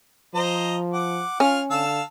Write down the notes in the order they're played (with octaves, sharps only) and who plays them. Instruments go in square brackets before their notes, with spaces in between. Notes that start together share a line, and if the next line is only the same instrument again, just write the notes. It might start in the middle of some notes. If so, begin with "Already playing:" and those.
[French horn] F3 [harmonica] C5 D#5 A#5
[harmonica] F#5 D6
[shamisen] C#4 [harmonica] F4 G#5 F6
[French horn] D3 [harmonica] F5 A5 E6